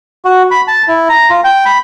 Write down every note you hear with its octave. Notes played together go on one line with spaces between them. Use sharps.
F#4
B5
A5
E4
A#5
F4
G5
B5